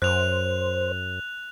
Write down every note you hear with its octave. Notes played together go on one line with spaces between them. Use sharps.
F#2 C5 F#6 F7